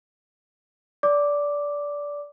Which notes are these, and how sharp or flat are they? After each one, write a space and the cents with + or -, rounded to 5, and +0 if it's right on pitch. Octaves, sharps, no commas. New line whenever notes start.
D5 -20 D6 +0